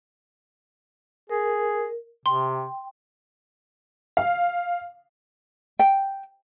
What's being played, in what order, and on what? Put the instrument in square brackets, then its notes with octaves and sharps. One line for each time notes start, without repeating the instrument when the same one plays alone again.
[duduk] G#4 [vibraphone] A#4
[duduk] C3 [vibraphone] G5 [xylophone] C6
[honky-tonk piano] F5
[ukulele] G5